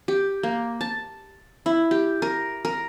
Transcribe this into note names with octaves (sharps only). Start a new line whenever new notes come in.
G4
A#3
A5
E4
G4
A#4
A#4